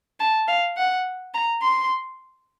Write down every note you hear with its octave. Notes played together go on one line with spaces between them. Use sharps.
A5
F5
F#5
A#5
C6